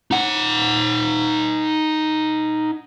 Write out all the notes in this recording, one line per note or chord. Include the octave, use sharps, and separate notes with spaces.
D#4 F#5